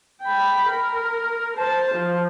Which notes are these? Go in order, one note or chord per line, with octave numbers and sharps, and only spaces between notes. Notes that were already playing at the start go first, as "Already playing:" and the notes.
G5 B5
A#4
C5 A5
F3